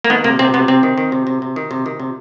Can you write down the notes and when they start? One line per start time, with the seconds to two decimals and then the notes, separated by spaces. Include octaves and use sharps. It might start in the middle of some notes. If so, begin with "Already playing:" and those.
0.04 A#3
0.10 D#3 B3
0.24 C3 A#3
0.39 C3 C4
0.54 C3 B3
0.68 C3 C4
0.83 D#3
0.98 D#3
1.12 C3
1.27 C3
1.42 C3
1.56 D#3
1.71 C3
1.86 D#3
2.00 C3